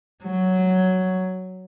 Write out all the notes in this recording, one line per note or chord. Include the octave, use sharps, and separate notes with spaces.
F#3